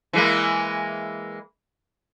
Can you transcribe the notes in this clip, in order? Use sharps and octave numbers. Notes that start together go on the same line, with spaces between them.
E3 G#3 A#3